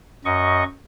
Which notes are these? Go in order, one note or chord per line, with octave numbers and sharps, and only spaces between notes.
F#2 D#5 C#6